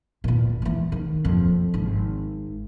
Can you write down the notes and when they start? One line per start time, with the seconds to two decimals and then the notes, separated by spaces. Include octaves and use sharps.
0.24 E2 A#2
0.62 E3 A#3
0.92 D#3
1.25 F2 A#3
1.74 G#1